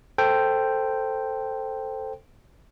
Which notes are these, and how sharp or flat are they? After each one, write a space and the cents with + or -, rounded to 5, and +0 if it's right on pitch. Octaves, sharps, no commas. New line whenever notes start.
A4 +10 C5 +0 G5 +0